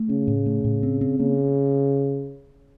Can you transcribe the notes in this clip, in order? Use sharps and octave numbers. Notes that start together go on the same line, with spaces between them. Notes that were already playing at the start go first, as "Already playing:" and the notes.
Already playing: A3
C#3 C#4
A2
A3
A2
C4
C4
C#3 A#3